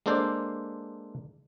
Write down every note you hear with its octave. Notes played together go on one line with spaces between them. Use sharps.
G#3 A#3 D4 A4 C5 D5